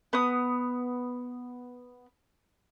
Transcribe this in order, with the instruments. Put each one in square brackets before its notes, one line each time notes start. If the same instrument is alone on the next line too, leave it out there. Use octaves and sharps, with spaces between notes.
[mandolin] B3 D#6